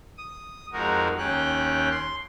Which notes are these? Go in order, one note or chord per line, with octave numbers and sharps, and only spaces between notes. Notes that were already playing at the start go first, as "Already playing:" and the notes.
D#6
F2 G#3 D#4 F#4 A#4
D#2 C#4 G5 F#6
C6